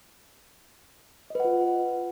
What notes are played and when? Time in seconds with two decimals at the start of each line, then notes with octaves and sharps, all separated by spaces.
1.30 D#5
1.35 B4
1.40 F#5
1.45 F4